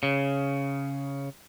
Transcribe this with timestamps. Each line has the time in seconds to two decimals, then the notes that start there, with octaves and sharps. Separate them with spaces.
0.03 C#3